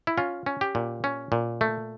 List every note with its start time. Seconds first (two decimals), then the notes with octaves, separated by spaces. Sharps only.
0.07 E4
0.18 C#4 F4
0.46 C#4
0.61 G4
0.75 A#2
1.04 C#4
1.32 A#2
1.61 A3